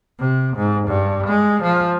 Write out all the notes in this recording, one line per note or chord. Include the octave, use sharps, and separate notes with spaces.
C3
G#2
G2
G#3
F3